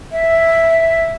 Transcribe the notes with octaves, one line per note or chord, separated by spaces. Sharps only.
E5